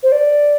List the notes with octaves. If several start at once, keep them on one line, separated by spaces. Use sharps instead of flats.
C5
D5